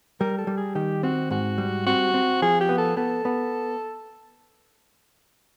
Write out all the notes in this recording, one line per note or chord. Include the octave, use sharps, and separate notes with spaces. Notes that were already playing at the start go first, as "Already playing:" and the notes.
G3 A#4
A4
G3
G#4
D#3 G4
C4 F#4
G#2 F#4
G3
C4 F#4
C4
F3 G#4
G4
B3
A4
B3 A4
B3